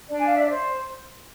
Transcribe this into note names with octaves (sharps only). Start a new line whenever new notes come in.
D4 D5
G#5
F5
E5
D5
C5